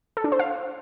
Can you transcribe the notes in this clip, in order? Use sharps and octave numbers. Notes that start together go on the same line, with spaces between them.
A4
D4
C5
F5